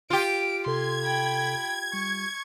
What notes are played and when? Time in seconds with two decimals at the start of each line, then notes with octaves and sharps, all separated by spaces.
0.10 F4 G4 D7
0.66 C3 A4 C6 G#6
1.01 G5 B5
1.93 G3 C#6